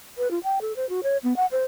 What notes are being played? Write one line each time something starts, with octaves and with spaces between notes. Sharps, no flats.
B4
F4
G5
A4
C5
F#4
C#5
B3
F#5
C5